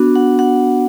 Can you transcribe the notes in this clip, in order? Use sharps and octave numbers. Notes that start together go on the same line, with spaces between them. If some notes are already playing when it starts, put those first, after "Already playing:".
Already playing: B3 D4 F#4
F#5
F#5